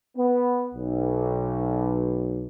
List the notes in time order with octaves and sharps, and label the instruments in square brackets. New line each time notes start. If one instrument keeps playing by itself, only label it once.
[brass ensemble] B3
B1